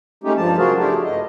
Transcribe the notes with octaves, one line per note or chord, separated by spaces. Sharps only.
G#3 A3 C#4 D#4 G4
G2 F3 A5
C#3 F#3 F4 F#4 G#4 A#4
A3 D4 E4 G4 G#4
G2 D#5